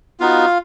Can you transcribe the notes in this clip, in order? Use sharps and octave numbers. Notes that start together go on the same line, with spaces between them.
B3 D#4 F4 F#4 F5